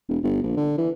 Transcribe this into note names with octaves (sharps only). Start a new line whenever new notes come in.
E1
G1
A#1
D3
E3